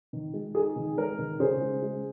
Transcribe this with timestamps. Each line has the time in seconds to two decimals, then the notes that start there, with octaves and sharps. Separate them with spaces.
0.13 D#3
0.34 G#3
0.55 D#4 G#4
0.76 D#3
0.97 G#3 A#4
1.19 D#3
1.40 C#3 G#4 C5
1.62 G#3
1.83 G#3